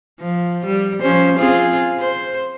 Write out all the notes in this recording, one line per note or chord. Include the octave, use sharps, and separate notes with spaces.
F3
G3
F3 C#4 C5
C4 F4 G#4
C5